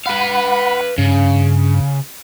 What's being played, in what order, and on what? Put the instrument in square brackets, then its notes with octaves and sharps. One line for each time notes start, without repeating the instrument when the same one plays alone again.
[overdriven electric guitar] B4 F5 [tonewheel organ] F#5 B5
[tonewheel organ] G2 [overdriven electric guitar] C#3